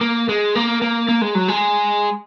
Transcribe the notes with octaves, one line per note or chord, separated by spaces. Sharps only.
A#3
G#3
A#3
A#3
A#3
G#3
F#3
G#3